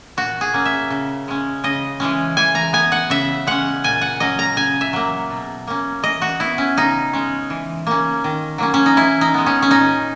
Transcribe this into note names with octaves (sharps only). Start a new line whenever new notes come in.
A#2 F#4
G#4
A#3 C#4
E5
C#3
G#3 C#4
C#3 D#5
E3 G#3 C#4
E3 G#5
A#5
B3 G#5
F#5
C#3 E5
G#3 C#4 F#5
A#2 G#5
F#5
F#3 C#4 D#5
A#5
C#3 G#5
E5
F#3 A#3
B2
A#3 C#4
E3 D#5
F#4
B3 E4
C#4
C#3 D#4
G#3 C#4
E3
A#3 C#4
D#3
F#3 A#3 C#4
C#4
D#4
E3 E4
D#4
G#3 B3
C#4
C#4
A#2 D#4